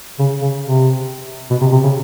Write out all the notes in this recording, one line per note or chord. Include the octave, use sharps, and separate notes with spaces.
C#3
C#3
C3
B2
C3
C3
C#3